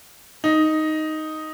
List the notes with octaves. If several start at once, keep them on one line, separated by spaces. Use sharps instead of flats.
D#4